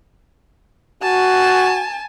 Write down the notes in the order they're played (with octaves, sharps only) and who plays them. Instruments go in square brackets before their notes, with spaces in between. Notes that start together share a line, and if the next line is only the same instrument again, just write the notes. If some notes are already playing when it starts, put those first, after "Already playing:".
[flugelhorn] F#4 [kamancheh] G#5 A5